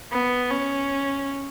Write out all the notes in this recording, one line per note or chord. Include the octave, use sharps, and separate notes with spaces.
B3
C#4